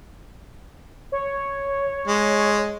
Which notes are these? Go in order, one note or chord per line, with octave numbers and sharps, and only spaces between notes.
C#5
G#3